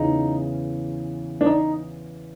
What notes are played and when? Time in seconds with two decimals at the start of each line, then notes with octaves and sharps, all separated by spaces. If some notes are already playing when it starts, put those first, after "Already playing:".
Already playing: E2 C#3 E3 D#4
1.41 D4
1.46 D#4